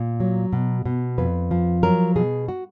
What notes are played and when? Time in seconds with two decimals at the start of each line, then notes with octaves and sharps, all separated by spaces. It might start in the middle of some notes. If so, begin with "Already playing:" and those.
Already playing: A#2
0.20 F#3
0.53 B2
0.85 B2
1.18 F2 B4
1.51 F3
1.83 F#3 A#4
2.16 B2 G#4
2.48 F#4